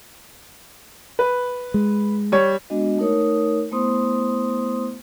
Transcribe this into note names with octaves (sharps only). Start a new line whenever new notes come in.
B4
G#3
G3 C#5
G#3 B3 D4 F#4 D#5
A3 D#4 A#4 C#5 D#6
A3 B3 E4 C5 C6 D#6